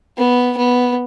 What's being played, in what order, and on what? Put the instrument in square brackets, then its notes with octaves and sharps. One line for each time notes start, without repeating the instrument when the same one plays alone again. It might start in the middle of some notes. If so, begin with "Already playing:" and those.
[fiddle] B3
B3